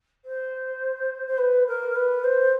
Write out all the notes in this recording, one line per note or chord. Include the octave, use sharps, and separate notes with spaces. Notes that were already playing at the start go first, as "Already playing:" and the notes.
C5
C5
B4
A#4
B4
C5